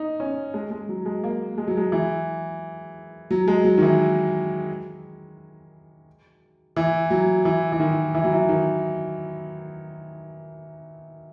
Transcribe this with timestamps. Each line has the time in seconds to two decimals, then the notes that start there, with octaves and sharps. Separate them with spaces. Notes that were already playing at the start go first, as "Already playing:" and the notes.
Already playing: D#4
0.20 C#4
0.54 G#3
0.71 G#3
0.89 F#3
1.06 G#3
1.24 A#3
1.58 G#3
1.68 F#3
1.77 G#3
1.92 E3
3.31 F#3
3.48 G#3
3.65 F#3
3.78 D#3
3.82 E3
6.76 E3
7.10 F#3
7.45 E3
7.72 E3
7.80 D#3
8.15 E3
8.24 F#3
8.33 E3
8.49 D#3